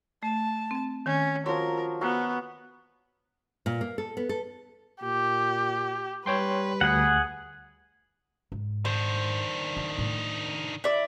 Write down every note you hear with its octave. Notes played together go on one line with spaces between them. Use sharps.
A3 A5
C4
D#3 C#4
F3 F#3 A#4 C6
B3 F#4 A#4 E6
A#2
A#3
A4
B3
A4
A#2 G4
G3 B4 C#5 G5 C6
D2 G#4 F#5
G#2
D#3 D4 C5
D#4
A2
E4 D5